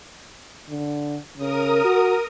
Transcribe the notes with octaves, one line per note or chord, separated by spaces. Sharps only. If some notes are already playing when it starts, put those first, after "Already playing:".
D3
C#3 A#4 D#6
F#4